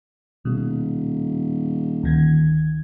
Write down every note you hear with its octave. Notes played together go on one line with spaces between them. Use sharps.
D#1 B2
D2 D#3 G#6